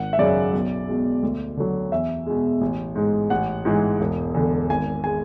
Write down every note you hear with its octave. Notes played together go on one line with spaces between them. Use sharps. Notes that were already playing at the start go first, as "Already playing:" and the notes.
Already playing: G#1 F#5
E5
F#2 C#3 D5
B1
B2 G#3
D2
D3 F#3
E2 E5
B2 G#3
A1
G#2 G#3
A1 F#5
G#2 E3 G#3
E1
E2 D3
G#1 G#5
G#3 G#5